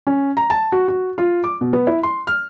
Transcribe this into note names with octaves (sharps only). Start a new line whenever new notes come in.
C#4
A#5
A5
F#4
F#4
F4
D6
B2
B3
E4
C6
F6